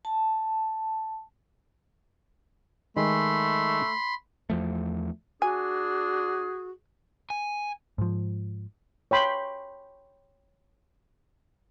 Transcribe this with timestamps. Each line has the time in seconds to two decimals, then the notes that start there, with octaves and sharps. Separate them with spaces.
0.05 A5
2.97 D#3 G#3 A3 B5 C6
4.50 E2 F3 A3
5.42 D4 F#4 G#4 G#5
7.30 G#5
7.98 G#2 F3
9.11 C#5 G5 B5 C6